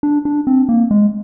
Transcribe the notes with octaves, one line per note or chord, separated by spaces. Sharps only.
D4
D4
C4
A#3
G#3